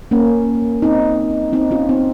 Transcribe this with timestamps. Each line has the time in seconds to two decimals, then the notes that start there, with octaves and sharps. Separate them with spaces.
0.11 A#3 C#4
0.82 C4 D#4
1.53 C4 D#4
1.71 C#4 F4
1.89 C4 D#4